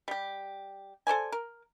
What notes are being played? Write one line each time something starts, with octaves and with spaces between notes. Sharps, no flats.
G3 G4
A4 C5 D5 G#5
A#4